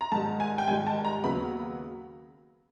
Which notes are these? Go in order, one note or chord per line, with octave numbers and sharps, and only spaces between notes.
A#5
G#2 D#3 G3 A5
G#5
G5
G#2 D#3 G3 G#5
A5
A#5
D#2 C#3 F#3 B3 B5